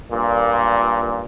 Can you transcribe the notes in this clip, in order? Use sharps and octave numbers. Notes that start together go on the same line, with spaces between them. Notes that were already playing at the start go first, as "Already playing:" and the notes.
G2 A#2